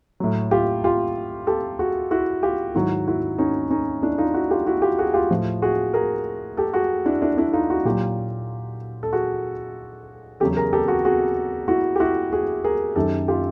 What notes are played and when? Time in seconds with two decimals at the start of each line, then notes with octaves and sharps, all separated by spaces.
0.20 A2 F#3
0.51 F4 G4
0.84 F4 G4
1.47 G4 A4
1.79 F#4 G#4
2.11 E4 F#4
2.43 F4 G4
2.75 G#2 D#3 F#3 E4 F#4
3.08 E4 F#4
3.38 C#4 D#4
3.70 C#4 D#4
4.03 D4 E4
4.18 D#4 F4
4.34 E4 F#4
4.51 F4 G4
4.67 E4 F#4
4.82 F4 G4
4.99 F#4 G#4
5.14 F4 G4
5.30 A2 F3
5.62 F#4 G#4
5.94 G#4 A#4
6.57 G4 A4
6.74 F#4 G#4
7.06 D4 E4
7.22 D4 E4
7.38 D4 E4
7.53 D#4 F4
7.70 E4 F#4
7.85 A#2 F#3 F4 G4
9.03 A4
9.13 F#4 G#4
10.40 E2 C#3 F#3 G4 A4
10.56 G#4 A#4
10.73 G4 A4
10.88 F#4 G#4
11.05 F#4 G#4
11.68 E4 F#4
11.96 G4
12.00 E4 F#4
12.33 F#4 G#4
12.64 G#4 A#4
12.96 F#2 D#3 F#3 G4 A4
13.28 F4 G4